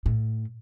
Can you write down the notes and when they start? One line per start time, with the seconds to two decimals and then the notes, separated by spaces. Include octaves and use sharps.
0.06 A2